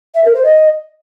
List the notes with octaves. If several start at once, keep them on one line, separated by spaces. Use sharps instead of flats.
E5
A#4
C5
D#5